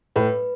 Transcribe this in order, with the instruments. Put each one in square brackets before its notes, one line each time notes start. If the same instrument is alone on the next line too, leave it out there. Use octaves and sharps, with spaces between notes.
[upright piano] A2 [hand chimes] B4